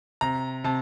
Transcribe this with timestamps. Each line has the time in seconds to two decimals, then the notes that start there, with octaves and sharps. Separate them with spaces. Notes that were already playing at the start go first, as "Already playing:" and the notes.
0.21 C3 A#5
0.64 C3 A5